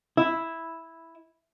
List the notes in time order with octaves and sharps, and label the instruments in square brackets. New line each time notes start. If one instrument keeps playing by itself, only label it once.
[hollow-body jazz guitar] E4